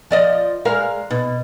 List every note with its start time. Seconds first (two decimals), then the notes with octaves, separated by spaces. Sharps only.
0.11 F3 D5 D#5
0.65 G#3 A#4 F5
1.11 B2